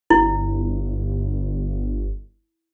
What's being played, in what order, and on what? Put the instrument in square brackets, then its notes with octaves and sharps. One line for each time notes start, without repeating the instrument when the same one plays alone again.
[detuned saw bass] G1 [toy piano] E4